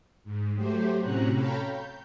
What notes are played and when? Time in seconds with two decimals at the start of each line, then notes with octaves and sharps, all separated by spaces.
0.24 G#2
0.55 F#3 A3 G4 C5
1.01 A2 C3 C#4 F#4 A#5 F#6
1.34 A4 C#5 F5 G5 A#5 B5
1.68 G6